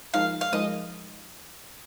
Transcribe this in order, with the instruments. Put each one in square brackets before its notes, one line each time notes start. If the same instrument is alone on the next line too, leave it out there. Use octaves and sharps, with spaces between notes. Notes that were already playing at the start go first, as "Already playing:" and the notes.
[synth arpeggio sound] F3 G#3 D#4 A#4 [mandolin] F5
[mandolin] F5
[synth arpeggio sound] F3 G#3 D#4 A#4 [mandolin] D#5